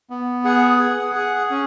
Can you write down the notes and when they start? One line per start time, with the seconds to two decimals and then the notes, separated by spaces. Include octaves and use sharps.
0.10 B3
0.45 G#4 F#5
0.80 G#4
1.15 G#4
1.50 C#4